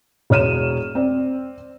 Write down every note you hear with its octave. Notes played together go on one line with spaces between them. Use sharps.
E1 C#5 F6 D#7 E7
C4 D5